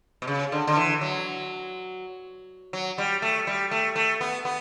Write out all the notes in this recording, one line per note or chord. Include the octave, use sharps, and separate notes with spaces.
B2
C#3
D3
D3
E3
F#3
F#3
G3
A3
G3
A3
A3
B3
B3